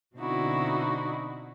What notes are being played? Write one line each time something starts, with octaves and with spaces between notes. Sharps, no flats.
B2 D3 C4 D#4 E4 F#4